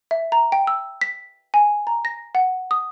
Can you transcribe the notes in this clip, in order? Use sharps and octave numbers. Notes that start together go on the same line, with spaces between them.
E5
A#5
G5
E6
B6
G#5
A#5
A#6
F#5
D#6